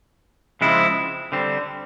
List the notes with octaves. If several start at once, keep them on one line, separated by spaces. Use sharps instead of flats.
C#3 F3 G#3 C4 E4
D3 G3 C4